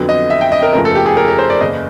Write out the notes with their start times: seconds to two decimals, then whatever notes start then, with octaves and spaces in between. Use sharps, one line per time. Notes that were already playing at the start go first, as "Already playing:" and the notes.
Already playing: F2 D3 F#3 B3
0.09 D#5
0.30 E5
0.41 G5
0.52 D#5
0.63 A#4
0.73 F#1 E2 C#3 F3 A3 A#4
0.85 A4
0.95 G4
1.06 G#4
1.17 A#4
1.28 A#4
1.39 C5
1.50 D5
1.61 F#1 E2 C#3 D#5